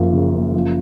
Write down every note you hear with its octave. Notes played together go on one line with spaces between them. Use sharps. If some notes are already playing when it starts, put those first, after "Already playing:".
Already playing: F#1 F#2 F3
C#3
F#1
F3